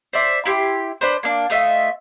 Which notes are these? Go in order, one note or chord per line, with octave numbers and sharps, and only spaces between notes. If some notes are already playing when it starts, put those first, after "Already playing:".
C5 D5 E5
E4 G4 C6
D4 B4 C5
A#3 D4
A3 F4 D#5 E5